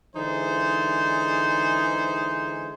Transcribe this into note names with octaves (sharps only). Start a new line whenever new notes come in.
D3 E3 G#3 D#4 G#4 C5